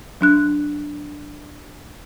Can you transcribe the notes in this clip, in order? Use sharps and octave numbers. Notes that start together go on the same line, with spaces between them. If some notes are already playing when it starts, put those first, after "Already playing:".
F#3 D4 F#6